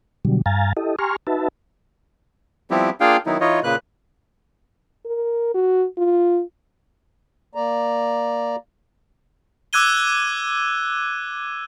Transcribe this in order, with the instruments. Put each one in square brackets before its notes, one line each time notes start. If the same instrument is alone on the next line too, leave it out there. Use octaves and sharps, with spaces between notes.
[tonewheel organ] B2 D3 F#3 G3
G2 F5 G#5 A#5 A6
E4 G4 A4 D#5
G4 G#5 A#5 C6 C#6 F6
D#4 F#4 B4 E5 A5
[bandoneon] F3 G3 B3 C4 E4 G4
A#3 D4 F4 G#4 F5 G5
D#3 F#3 B3 D#4 E4
E3 D#4 F4 C#5 D#5
A#2 C#3 A#3 B4 F#6
[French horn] A#4
F#4
F4
[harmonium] A#3 D5 A#5
[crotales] D6 E6 F#6 G#6 D#7 G7